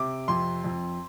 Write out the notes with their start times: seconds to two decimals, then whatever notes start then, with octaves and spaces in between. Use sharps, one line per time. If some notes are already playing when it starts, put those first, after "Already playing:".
Already playing: C3 D6
0.28 F2 C6
0.64 F2